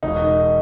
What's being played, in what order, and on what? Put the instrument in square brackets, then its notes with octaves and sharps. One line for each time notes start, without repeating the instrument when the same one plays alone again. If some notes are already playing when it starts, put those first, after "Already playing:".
[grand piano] E1 [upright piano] D#4